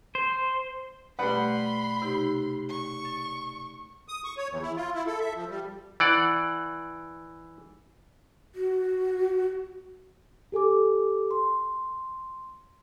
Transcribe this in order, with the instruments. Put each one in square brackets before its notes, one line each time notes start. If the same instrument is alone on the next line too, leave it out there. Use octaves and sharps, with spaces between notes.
[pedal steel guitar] C5
[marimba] B2 A3 [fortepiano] G3 B4 F#5 [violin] B5 C6
[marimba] C3 D#4 G4
[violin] C#6
[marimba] A6
[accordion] D#6
C#6
C#5
E2
E4
F4
E4
A4
E5
F3
G3
[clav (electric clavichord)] E3 D5 F#5
[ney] F#4
[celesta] G4 A4 G#5 D6
C6